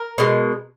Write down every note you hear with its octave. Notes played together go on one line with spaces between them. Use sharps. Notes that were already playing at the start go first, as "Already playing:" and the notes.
Already playing: A#4
B2 G#3